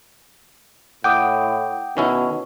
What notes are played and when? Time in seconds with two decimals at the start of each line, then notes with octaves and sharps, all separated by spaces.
1.04 A2 F#5 G5 D6 D#6
1.97 B2 D#3 C#4 E4